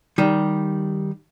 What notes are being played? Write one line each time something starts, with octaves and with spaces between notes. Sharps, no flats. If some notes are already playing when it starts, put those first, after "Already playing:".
D#3 G3